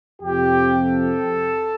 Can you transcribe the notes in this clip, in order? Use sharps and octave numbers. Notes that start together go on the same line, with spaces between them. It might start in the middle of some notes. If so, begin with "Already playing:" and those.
F2 C3 F3 G4
A4